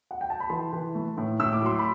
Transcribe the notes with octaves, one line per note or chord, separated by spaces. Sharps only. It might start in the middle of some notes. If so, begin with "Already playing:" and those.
F#5
G5
A5
B5
E3 A5 C6
E3
A3
A2
A2 E6
D6
F#3 C6
B5